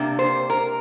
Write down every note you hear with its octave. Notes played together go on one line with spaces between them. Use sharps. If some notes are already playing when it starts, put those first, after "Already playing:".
Already playing: C3 A#3 D4
C5
A#4